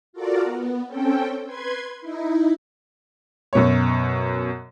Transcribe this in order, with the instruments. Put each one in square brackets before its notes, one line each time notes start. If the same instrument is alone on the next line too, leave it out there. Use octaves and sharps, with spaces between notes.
[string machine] F4 F#4 A4 A#4 D5
B3
C4 C#4 A4 G5
B4 C6 G#6
D#4 E4
[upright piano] F#2 B2 C#5